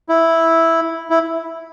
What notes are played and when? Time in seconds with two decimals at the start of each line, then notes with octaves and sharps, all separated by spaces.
0.09 E4
1.10 E4